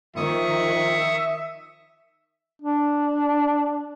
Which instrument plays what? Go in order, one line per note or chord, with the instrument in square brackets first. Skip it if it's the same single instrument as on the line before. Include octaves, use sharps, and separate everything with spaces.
[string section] D#3 [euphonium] F3 [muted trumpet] E5 [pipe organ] C#6 D#6
[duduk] D4